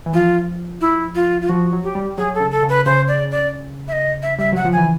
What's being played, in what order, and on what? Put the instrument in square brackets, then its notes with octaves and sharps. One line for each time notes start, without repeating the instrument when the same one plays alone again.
[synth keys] E3
[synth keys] F3 [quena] F4
[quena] E4
F4
F4
[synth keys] F3 [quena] F#4
[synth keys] F#3
[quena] G4
[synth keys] G3
[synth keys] F#3 [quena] G#4
[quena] A4
[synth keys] C#3
[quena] A4
[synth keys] C#3
[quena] B4
[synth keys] C#3 [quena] C5
[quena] D5
D5
E5
D#5
E5
[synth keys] G3 [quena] E5
[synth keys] F#3 [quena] F#5
[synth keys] F3
[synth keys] E3 [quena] G#5